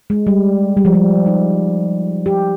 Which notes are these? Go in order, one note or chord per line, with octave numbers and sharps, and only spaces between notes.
G#3
G3
G3
F3
G3
D#4
G4